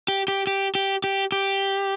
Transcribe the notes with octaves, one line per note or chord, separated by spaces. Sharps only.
G4
G4
G4
G4
G4
G4